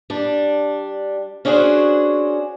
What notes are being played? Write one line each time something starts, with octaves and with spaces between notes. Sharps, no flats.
G3 D4
C#4 D4 F#4 G#4 C5 C#5